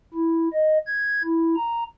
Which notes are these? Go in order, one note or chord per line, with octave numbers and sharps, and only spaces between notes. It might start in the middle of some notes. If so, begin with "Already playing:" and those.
E4
D#5
G#6
E4
A#5